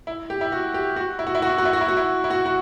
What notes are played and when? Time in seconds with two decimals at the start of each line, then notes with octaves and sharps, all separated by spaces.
0.07 E4
0.30 G4
0.41 E4
0.52 F#4
0.74 G4
0.96 F#4
1.19 E4
1.27 F#4
1.35 E4
1.42 F#4
1.49 E4
1.58 F#4
1.65 E4
1.73 F#4
1.81 E4
1.88 F#4
1.97 E4
2.24 E4
2.31 F#4
2.46 F#4